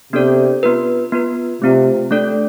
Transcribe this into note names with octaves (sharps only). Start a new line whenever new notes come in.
C3 B3 D4 A4 D5
B3 F4 B4
B3 F4 B4
C3 A3 C4 F4
A3 D4 A4 D5